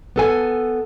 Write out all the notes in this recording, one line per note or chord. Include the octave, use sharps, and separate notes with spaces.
B3 A4 G#5